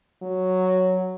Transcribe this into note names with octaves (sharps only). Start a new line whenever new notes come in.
F#3